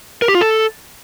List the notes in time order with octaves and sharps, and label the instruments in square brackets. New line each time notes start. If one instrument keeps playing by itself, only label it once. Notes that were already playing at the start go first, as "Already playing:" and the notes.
[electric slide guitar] A#4
G4
F4
A4